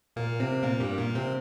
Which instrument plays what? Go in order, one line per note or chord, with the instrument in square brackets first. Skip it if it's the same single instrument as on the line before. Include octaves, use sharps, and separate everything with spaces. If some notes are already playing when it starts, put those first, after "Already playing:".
[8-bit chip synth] A#2 A#3
C3 C4
A#2 A#3
G2 G3
A#2 A#3
C3 C4